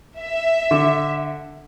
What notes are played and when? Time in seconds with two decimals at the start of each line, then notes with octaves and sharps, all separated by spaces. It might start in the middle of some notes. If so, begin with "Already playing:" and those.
0.20 E5
0.71 D3